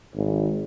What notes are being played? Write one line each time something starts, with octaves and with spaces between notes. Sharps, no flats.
G#1